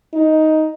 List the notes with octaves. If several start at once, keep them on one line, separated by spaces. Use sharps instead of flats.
D#4